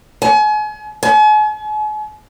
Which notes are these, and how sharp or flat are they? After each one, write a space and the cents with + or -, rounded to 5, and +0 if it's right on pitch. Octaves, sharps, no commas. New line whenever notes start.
G#5 +40
G#5 +40